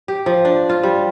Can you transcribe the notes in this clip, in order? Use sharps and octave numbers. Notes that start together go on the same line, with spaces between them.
G4
F3
D4
F4
G3